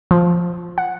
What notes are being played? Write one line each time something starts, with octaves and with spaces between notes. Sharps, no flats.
F3
F#5